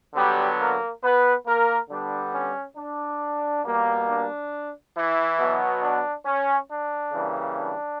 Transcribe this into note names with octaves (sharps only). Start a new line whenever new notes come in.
D3 F#3 G3 B3 G4
A#3 A#4
B3 B4
A#3 A#4
D3 G3 B3 D4
C#4
D4
B2 G3 A#3
D4
E3 E4
B2 F#3 B3
D4
C#4
D4
C#3 E3 G3 A#3
D4